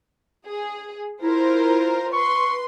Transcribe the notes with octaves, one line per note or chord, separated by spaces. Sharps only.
G#4
E4 F4 A#4 C5
B4 C6 C#6